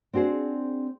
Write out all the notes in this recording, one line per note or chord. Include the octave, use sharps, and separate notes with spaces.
C4 D4 F#4 G#4 C5